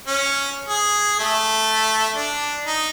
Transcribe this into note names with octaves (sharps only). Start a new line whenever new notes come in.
C#4
G#4
A3
D4
D#4